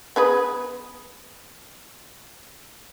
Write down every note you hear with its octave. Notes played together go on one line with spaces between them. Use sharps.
B3 G#4 B4